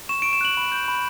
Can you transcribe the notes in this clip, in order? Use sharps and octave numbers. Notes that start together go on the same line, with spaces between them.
C#6 E7
D7
C#6
E7
F#6 F#7
B5
G6
B5